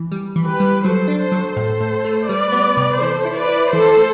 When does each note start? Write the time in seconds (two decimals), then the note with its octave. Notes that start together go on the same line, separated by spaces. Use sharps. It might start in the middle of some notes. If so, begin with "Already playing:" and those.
Already playing: E3
0.12 G3
0.36 E3
0.48 G4 B4
0.60 G3
0.84 F#3 A4 C5
1.08 D4
1.20 A4 C5
1.32 F#3
1.56 A2 A4 C5
1.80 A2
2.05 A3
2.29 G3 B4 D5
2.52 B3
2.77 C3
3.01 E3 A4 C5
3.25 E4
3.37 B4 D5
3.49 E4
3.73 E3 A4 C5
3.97 A3